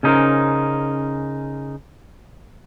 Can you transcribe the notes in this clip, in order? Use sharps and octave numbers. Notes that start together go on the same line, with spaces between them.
C#3 C#4 D#4 F4 A#4 C5